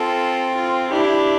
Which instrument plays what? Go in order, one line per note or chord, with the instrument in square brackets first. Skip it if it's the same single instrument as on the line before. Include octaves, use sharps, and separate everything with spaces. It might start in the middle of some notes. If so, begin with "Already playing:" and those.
Already playing: [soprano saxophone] C4 [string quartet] F4 A4
[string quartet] F4
[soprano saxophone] D4 [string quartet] E4 G4